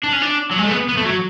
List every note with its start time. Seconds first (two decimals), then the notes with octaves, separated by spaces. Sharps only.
0.03 D4
0.12 C#4
0.22 D4
0.51 F#3
0.58 G#3
0.65 A3
0.71 B3
0.89 B3
0.97 A3
1.05 F#3